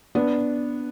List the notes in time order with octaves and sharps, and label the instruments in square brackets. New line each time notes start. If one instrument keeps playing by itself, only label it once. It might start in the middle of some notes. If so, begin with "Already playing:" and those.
[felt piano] B3 D4